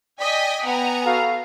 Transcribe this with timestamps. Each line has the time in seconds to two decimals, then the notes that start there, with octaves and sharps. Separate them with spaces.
0.20 D5 D#5 G5 G#5 B6
0.66 B3 F#5 G#5 A#5
1.06 F#4 A4 F5